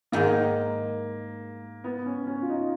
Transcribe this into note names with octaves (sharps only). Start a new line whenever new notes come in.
G#2 D#3 G#3 A#3
B3
C#4
C#4
F4
D#4